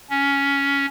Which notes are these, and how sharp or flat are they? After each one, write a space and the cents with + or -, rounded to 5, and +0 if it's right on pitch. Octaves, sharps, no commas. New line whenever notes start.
C#4 +10